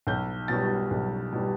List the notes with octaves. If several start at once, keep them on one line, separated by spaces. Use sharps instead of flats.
B1 G6
B2 G3 A6
B1
B2 G3